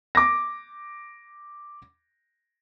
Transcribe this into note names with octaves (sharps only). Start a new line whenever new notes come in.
D6 A#6